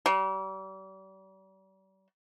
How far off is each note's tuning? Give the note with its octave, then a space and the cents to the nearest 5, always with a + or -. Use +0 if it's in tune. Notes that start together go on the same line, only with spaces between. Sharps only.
G3 -40